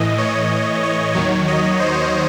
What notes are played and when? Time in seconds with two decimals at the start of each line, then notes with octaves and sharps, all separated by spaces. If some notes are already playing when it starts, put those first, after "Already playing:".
Already playing: A2 E3 D#5
0.18 C#5
0.83 C#5
1.15 D#2 D#3 F#3 C#5
1.48 D#5
1.80 C5